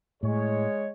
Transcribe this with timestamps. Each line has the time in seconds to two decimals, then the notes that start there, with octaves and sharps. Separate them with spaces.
0.23 A2 G#3 C#5